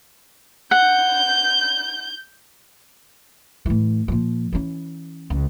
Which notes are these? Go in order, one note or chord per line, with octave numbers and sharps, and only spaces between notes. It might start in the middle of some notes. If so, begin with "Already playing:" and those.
F#5 G6
A2 E3
A#2 F3
E3 C#4
C#2